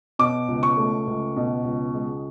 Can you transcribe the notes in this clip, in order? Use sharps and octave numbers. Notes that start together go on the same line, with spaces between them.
B2 D6
C#2
C#6
A3
C#2
B2
C#2
G#3